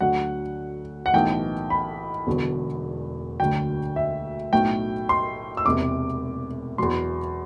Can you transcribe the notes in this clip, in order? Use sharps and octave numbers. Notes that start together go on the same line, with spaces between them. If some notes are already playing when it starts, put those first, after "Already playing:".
D2 D3 F#3 F#5
F#5
B1 A2 E3 G5
B5
E1 E2 D3 F#3
D2 D3 F#3 G5
E5
B1 A2 F#3 G5
C6
E6
E1 E2 C3 D6
E2 B2 F#3 C6